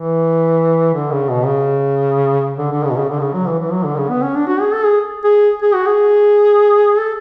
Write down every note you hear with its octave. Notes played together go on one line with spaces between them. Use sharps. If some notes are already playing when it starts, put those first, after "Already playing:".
Already playing: E3
D3
C#3
B2
C#3
D3
D3
C#3
B2
C#3
D3
C#3
F#3
E3
E3
F#3
D3
C#3
B3
C#4
D4
F#4
G#4
A4
G#4
G#4
G#4
F#4
G#4
A4